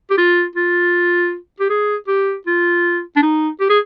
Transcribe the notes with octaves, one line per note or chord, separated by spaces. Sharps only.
G4
F4
F4
G4
G#4
G4
F4
D4
D#4
G4
G#4